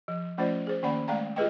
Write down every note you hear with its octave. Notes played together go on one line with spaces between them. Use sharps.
F3
F3 A3 C#4 F4 C5 D5
G#4 C5
D#3 A#3 C#4 D5 F#5 B5
G#3 A3 D5 F5 G5 A#5
F4 G4 G#4 B4 D#5 G5